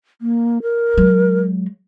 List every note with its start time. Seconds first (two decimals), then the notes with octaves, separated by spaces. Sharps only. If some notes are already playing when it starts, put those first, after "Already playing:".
0.21 A#3
0.62 A#4
0.97 F#3 G#3